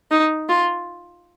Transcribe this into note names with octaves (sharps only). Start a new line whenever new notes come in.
D#4
F4